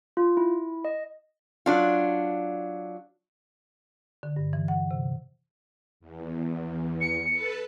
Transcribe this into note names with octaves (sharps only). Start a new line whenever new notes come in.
F4
E4
D#5
F#3 D4 F4
D3
G2
E3
F#5
C3
E2
C#7
A4 B4 A5